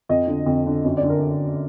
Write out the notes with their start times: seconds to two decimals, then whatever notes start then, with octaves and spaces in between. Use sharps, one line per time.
0.09 F2 D#5
0.27 D3
0.46 F2
0.66 D3
0.84 F#2
0.97 D5
1.03 D3
1.10 A#4